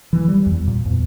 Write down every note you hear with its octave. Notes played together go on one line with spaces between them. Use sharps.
E3
G3
E2
A#2
E2